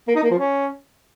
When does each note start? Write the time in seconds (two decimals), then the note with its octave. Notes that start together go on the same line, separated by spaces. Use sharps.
0.08 A#3
0.16 D#4
0.23 A#3
0.31 F3
0.38 C#4